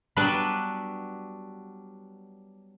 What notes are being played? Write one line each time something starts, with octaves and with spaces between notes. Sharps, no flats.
F#3 G3 B3 D4 B4 A5